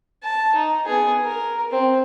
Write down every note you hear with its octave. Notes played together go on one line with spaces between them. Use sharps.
A5
D#4
B3 G#4
A#4
C4